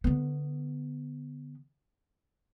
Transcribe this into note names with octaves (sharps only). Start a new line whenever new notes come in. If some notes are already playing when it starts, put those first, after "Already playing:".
D3 B3